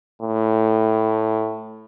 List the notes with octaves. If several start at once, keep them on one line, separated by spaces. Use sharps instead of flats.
A2